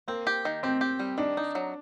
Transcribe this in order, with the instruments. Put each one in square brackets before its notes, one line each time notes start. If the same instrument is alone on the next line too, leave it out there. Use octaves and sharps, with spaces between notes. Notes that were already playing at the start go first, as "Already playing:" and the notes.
[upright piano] A#3 [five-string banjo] C4
[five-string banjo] G4
D#3
[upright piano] C4 [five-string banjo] G4
[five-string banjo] G4
G3
[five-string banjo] D#3 [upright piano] D4
[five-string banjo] D#4
F#3